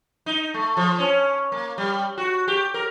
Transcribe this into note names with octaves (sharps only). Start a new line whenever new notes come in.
D#4
A3
F3
C#4
A#3
G3
F#4
G4
A#4